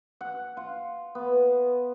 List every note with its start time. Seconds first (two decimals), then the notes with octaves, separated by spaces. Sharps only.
0.21 F#5
0.57 F4
1.15 B3